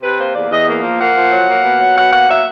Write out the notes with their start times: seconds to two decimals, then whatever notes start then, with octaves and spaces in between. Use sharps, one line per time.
0.02 C3 B4
0.19 A#3 C5
0.34 E2 D5
0.50 E2 D#5
0.67 A#3
0.83 F3
1.00 A#3 F#5
1.15 F3
1.32 F#3
1.47 A#3
1.64 B2
1.80 F#3
1.96 B2 F#5
2.12 A#3 F#5
2.29 F#3 E5